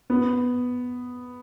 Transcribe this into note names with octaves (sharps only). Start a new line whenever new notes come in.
B3